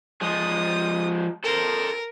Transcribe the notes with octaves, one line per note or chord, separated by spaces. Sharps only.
F3 G#3 D#6
A4 A#4 C5